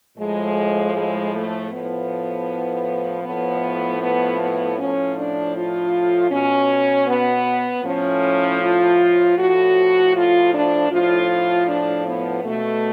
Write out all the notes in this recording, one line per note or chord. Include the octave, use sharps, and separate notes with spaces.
A2 F3 G#3
G#3
A3
A2 F3 B3
A2 F3 B3
B3
B3
A2 F3 C#4
D4
F4
B2 C#4
B3
A2 F3 C#4
F4
A2 F3 F#4
F4
D4
A2 F3 F4
D4
B3
B2 A3